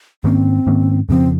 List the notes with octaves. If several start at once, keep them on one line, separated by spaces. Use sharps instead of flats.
G#2 D#3 A#3 C4 C#4
G#2 D#3 A#3 C#4
F2 C#3 F3 C4